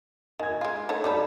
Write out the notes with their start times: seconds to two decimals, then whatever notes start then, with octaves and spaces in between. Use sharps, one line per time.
0.39 D#3 D#5 G#5 G#6
0.61 G#3 F4
0.89 A3 D#4 C#5
1.04 G3 D#4 A4 D5 A#5 B5